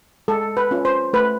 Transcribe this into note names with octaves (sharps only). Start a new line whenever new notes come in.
G#3 A4
B4
C#4 F4
C5
A3 B4